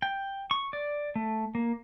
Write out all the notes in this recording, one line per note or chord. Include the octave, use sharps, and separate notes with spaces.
G5
C#6
D5
A3
A#3